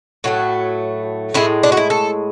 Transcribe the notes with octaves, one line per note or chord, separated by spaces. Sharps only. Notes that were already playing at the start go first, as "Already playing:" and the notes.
A2 F#3 A3 F#4
A2 G#3 E4
D4
F#4
E4
A4